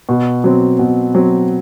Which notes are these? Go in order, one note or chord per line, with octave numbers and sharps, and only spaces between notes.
B2
F#3 C4
B2
F#3 C4